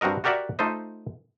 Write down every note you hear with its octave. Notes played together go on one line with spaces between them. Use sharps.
G2 C4 F#4 A#4 D#5
F#4 G4 A#4 D5 E5 F#5
A3 D#4 F4 C5 D#5